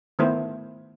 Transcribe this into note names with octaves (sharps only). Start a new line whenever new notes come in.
D#3 A3 B3 E4 C5